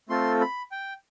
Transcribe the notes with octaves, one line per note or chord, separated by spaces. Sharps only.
A3 C4 F4 A4 C6
B5
G5